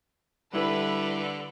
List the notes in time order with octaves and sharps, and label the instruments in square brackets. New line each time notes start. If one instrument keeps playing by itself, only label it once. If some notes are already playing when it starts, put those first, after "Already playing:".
[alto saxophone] D3 [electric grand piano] G3 E4 A4 [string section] B4